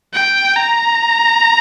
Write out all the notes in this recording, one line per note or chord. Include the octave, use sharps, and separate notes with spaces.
G5
A#5